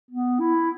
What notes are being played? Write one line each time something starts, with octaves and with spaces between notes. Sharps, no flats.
B3
E4